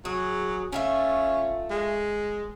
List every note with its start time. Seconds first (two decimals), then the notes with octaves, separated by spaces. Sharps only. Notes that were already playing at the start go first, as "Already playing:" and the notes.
0.05 F#3 G#4
0.72 A3 C#4 F4 E5
1.71 G#3